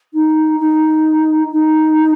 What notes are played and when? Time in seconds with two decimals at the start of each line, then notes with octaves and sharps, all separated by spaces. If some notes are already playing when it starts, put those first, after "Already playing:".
0.14 D#4
0.59 D#4
1.51 D#4